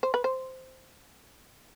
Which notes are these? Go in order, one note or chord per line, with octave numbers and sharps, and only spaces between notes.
C5
B4
C5